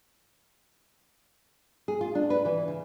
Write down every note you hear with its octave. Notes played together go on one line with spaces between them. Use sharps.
G#4
F4
D4
B4
E3
C#3